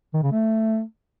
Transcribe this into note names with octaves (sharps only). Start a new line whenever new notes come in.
D#3
C#3
A3